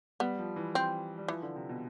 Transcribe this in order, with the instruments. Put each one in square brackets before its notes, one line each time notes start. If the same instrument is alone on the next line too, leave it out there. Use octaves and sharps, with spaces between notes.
[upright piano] G3 [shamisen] B3
[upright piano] F3
E3
[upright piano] G3 [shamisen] C4
[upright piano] G3
[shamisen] E3 [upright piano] F3
[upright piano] D3
C3
B2